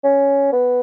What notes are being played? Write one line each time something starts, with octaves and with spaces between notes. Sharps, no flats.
C#4
B3